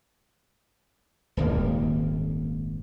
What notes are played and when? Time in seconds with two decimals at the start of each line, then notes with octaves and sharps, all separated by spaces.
1.37 D#1 G#1 D#2 A#3